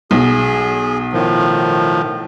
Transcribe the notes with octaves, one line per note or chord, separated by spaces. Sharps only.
B1 G#4
A2 D#3 F3